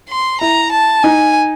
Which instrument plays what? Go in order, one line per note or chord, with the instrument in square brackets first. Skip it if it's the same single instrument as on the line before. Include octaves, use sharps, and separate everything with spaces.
[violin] C6
[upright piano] E4 [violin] A#5
[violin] A5
[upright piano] D#4 [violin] G#5